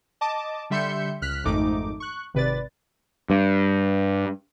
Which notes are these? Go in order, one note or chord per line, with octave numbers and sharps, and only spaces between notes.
D#5 A5 D6
D3 G3 E5 C6 G6 C#7
C#2 F6 F#6 B6
G#1 F2 G#2 A3 D#4 D6
C#6 F#6
G#1 C3 B4 D5 A6
G2